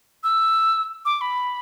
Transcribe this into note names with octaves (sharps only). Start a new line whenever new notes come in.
E6
D6
B5